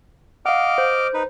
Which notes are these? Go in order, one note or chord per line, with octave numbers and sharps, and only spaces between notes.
D#5 F5 F#5 D6 F6
C5
D#4 B4